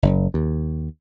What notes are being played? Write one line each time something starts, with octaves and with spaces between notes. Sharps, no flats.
F#1
D#2